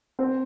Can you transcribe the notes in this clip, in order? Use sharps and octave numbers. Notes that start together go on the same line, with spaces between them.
C4 C5